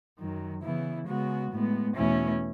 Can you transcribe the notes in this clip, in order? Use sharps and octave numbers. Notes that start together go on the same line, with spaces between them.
F#2 D#3 F#3
C#3 E3 B3 E4
C#3 G#3 B3 F#4
A2 G#3 B3
E2 B2 A3 C#4 E4